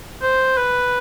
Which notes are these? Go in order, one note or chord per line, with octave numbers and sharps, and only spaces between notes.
C5
B4